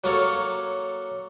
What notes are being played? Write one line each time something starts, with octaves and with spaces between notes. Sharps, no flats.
F#3 A#3 A4 C#5